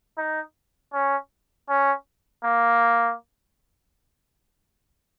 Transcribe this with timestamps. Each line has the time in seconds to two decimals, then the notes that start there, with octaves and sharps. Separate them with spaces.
0.18 D#4
0.94 C#4
1.69 C#4
2.45 A#3